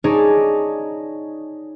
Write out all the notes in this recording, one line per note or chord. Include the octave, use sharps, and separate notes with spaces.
D#4 G#4 C#5 D5 G#5 A5